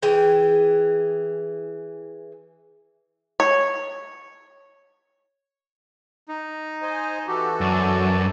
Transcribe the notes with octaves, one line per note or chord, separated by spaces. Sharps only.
E3 G#4 G5
C#5
D#4
C5 D#5 G#5
E3 F#4 G4 A4
F#2 D5